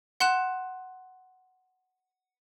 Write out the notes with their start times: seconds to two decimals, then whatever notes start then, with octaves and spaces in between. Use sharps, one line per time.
0.20 F#5 C6 F#6 E7